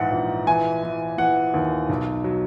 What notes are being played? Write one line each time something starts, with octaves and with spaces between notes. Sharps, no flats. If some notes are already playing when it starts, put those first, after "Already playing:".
Already playing: A#1 G#2 E3 F#5
A#1
E3 G#5
E3
E3 F#5
D#2
B1
F#3